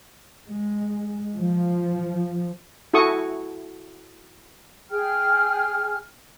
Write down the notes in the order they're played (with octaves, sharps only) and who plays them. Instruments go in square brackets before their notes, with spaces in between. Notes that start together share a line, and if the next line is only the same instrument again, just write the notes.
[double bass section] G#3
F3
[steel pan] E4 F#4 A4 C#6 D#6
[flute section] G#4 G5 F6